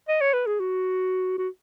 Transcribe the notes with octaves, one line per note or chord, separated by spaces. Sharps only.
D#5
C#5
B4
G#4
F#4
F#4